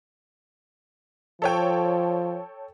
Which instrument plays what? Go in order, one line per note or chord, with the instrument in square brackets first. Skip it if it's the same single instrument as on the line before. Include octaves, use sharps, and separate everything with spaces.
[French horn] F3 [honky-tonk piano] A4 C#5 G5